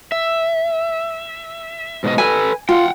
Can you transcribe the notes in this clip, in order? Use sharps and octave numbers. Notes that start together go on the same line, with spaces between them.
E5
G#2 B2 D#5
A4 B4 G#5
F4 F#5 G5